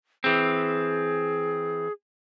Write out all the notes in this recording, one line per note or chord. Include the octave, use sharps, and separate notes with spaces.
E3 C4 G#4